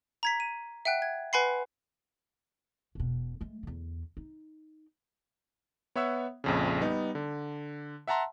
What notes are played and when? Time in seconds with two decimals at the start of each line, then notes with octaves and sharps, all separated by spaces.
0.23 A#5 G#6 B6
0.40 D#7
0.85 E5 F#5 G5 F#6
1.02 G#6
1.33 B4 F#5 G#5 B5 C6 C7
2.95 E1 B2
3.41 G#3 A3
3.63 E2 D3
4.17 D#4
5.96 B3 C#5 E5 F#5 E6
6.44 A#1 F2 C#3
6.81 G3 B3 D#4
7.15 D3
8.08 E5 F#5 A5 A#5 C6